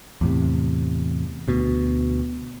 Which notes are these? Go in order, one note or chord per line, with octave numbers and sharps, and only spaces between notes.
E2 A2 C3
D2 B2